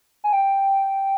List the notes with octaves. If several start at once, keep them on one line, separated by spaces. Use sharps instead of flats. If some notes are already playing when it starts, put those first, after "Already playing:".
G#5
G5